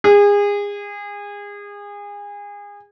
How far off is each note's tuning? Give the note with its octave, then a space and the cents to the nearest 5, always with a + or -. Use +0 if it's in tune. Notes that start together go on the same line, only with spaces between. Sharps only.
G#4 -30